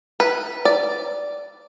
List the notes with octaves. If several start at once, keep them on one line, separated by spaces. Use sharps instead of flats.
B4
D5